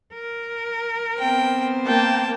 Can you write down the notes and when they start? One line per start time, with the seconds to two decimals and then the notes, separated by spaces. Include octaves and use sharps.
0.13 A#4
1.19 B3 C4 C5 G5
1.87 A#3 A#4 G5 A5